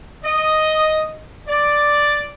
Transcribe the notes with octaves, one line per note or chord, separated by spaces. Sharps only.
D#5
D5